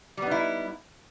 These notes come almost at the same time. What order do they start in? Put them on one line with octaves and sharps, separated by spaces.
G3 B3 D#4 E4